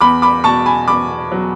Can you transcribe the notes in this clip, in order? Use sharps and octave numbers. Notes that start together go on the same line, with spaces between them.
E2 B5 D6
B5 D6
B2 A5 C#6
G#5 B5
E2 B5 D6
F#3